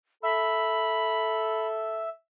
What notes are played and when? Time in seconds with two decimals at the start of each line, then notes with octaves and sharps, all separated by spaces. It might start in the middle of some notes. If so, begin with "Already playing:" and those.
0.23 A4 E5 B5